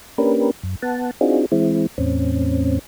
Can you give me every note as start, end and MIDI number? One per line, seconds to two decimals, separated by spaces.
0.18 0.51 58
0.18 0.51 61
0.18 0.51 62
0.18 0.51 67
0.18 0.51 70
0.18 0.51 71
0.63 0.75 42
0.82 1.11 59
0.82 1.11 78
0.82 1.11 81
1.21 1.46 60
1.21 1.46 62
1.21 1.46 63
1.21 1.46 65
1.21 1.46 66
1.21 1.46 68
1.52 1.87 52
1.52 1.87 56
1.52 1.87 60
1.52 1.87 64
1.98 2.79 40
1.98 2.79 45
1.98 2.79 60
1.98 2.79 61